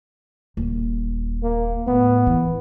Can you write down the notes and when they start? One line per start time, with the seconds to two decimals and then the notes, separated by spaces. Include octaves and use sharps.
0.57 D#1
1.43 A#3
1.87 A2 B3
2.27 E3